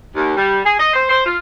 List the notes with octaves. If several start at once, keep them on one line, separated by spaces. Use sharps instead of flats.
D#2
G3
G#4
D#5
C5
C5
F4